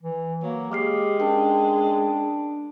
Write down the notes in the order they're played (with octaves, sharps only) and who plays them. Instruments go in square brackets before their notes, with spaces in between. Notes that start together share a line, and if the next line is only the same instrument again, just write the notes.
[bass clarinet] E3
[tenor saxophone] F#3 [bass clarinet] A#3
[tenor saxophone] G#3 [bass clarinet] G4 [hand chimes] D6 F6 C7
[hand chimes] C#4 A#4 G5 [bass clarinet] D4